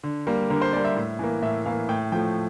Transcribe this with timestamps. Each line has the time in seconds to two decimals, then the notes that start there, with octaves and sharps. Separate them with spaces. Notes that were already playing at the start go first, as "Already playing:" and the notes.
0.03 D3
0.27 G3 A#3
0.50 D3 A#4
0.61 C5
0.73 G3 A#3 D5
0.85 E5
0.96 A2
1.19 E3 A#3
1.42 A2 E5
1.66 E3 A#3 F5
1.89 A2 G5
2.12 F3 A3 G5